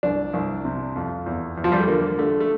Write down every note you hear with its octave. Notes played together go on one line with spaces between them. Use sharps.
C2 D4
C2
C3
F2
E2
E2
F3
G3
A3
D3 A#3
D3 A3
A3